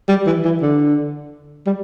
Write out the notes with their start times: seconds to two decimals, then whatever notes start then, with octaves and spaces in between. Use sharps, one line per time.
0.09 G3
0.26 E3
0.45 E3
0.62 D3
1.67 G3